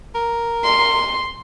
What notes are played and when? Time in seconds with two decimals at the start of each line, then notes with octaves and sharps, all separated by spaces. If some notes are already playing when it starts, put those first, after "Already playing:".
0.15 A#4
0.64 C6